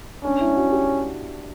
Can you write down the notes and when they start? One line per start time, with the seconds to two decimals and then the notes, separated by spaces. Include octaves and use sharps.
0.24 C#4 D4
0.41 E4
0.57 F#4
0.72 G4